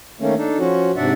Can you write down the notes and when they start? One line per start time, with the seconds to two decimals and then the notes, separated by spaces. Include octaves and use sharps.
0.20 D#3 A3 A#3 C#4
0.38 D4 D#4 A4
0.58 F3 C#4 F#4
0.96 G#2 C3 D4 D5 E5 F#5